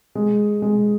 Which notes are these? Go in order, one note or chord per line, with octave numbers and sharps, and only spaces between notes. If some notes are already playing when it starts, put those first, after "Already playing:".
G#3
G#3